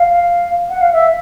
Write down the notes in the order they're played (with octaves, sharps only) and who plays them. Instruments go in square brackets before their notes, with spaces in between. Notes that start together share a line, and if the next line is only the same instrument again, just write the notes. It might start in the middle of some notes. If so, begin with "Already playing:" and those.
Already playing: [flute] F5
F#5
F5
E5